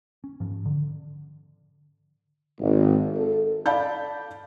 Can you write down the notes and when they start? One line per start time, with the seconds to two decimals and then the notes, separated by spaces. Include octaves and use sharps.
0.24 C#4
0.40 G#2 F3
0.66 D3
2.60 G#1
3.15 A4
3.66 D5 F5 A5 B5 G6